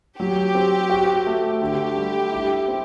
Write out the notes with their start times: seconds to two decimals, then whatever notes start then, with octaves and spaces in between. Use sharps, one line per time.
0.19 F#3 G4
0.55 C4
0.90 F#4
1.26 A3
1.61 D3 G4
1.97 G3
2.32 E4
2.68 C4